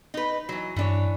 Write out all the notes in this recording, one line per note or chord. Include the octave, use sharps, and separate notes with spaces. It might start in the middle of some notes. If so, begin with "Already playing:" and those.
D#4 B4
E3 F#3
G2 E3 D4 C#5